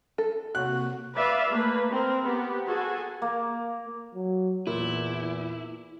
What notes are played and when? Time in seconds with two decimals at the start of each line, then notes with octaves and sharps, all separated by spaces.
0.18 A4
0.55 C3 A#3 F#4 F#6
1.14 B4 D5 E5 F5
1.50 A3 A#3 B4
1.91 C4 A#4
2.23 B3 G4
2.67 F#4 G#4 A4 G#5
3.22 A#3
4.15 F#3
4.67 E2 A#2 E4